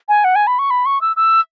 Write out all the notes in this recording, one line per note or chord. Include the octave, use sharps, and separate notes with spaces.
G#5
F#5
G#5
B5
C#6
B5
C#6
E6
E6